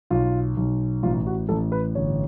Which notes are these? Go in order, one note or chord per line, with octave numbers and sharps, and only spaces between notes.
B1 F4
B1
A1 F4
F#4
A1 A4
B4
G1 C#5